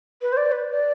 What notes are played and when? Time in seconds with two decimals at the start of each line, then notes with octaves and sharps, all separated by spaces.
0.22 B4
0.32 C5
0.37 D5
0.52 B4
0.71 D5